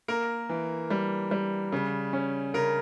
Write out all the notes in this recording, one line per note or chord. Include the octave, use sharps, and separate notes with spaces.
A#3 A#4
E3
G3
G3
C#3
C#4
C#3 A#4